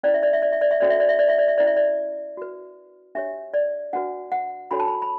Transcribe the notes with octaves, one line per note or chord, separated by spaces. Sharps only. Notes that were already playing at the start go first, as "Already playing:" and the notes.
C#4 E4 B4 D5
E5
D5
E5
D5
E5
D5
E5
C#4 F#4 A4 C#5 D5
E5
D5
E5
D5
E5
D5
E5
C#4 E4 B4 D5
E5
D5
F#4 B4
D4 G4 C#5 E5
D5
D4 F#4 B4 F#5
F#5
D4 F#4 A4 C#5 B5
A5
B5
B5